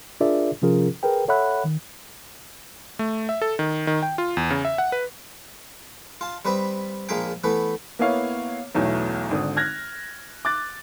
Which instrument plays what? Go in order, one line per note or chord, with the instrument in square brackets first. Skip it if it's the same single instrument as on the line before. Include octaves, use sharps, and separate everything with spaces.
[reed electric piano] D4 F4 G#4 A#4 D5 E5
C3 F3 C#4 F4 G#4 A#4
G#4 A#4 B4 G5
A4 C#5 E5 F#5 B5 F#6
D#3
[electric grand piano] A3
E5
A4
D#3
D#3
G5
F4
E2
C#3
E5
F#5
B4
[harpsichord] F4 A5
G3 C4 B4 D#5 E5
A#1 G#3 A#3 E5 F5 G5
E3 A3 B3 B4
[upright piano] A#3 B3 E4 C#5 F5
B1 E2 F#3 A3
G#1 D3 D#6
F6 F#6 G#6 A#6
D6 F#6 A6